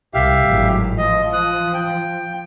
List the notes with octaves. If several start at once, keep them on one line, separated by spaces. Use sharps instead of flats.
C2 G4 E5 F5
G#1 A2 F#3
F3 D#5
D#6 F#6
G5